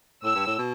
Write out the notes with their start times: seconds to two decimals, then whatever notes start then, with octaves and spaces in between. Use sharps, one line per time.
0.24 A2 E6
0.35 G2
0.47 A2
0.58 B2